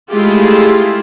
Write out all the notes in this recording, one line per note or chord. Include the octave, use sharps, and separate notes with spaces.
G#3 A3 E4 F4 G4 G#4